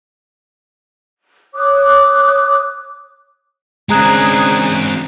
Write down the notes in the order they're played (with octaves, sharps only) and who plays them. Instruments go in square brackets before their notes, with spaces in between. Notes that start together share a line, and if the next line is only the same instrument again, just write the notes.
[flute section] C#5 D6 D#6 F#6
[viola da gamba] C#3 D4 [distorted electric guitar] G#3 C4 [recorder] G#4 [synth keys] G#5 A#5 F#6